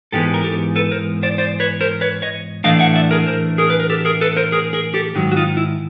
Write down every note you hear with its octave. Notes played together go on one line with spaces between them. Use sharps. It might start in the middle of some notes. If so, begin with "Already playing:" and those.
G#2 E3 G#3 B3 D#4 G4 A4
A#4
G4 A4
A4 B4
A#4 C5
C5 D5
C5 D5
B4 C#5
A#4 C5
B4 C#5
C#5 D#5
A2 E3 A3 D4 D#5 F5
E5 F#5
D5 E5
G#4 A#4
A#4 C5
G#4 A#4
B4
A#4
G4 A4
G#4 A#4
A4 B4
A#4 C5
G#4 A#4
G#4 A#4
G4 A4
G#2 D#3 F#3
F#4
D#4 F4
E4